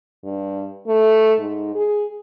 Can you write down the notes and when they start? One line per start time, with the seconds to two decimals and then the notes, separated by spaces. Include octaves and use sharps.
0.24 G2
0.87 A3
1.39 G#2
1.75 G#4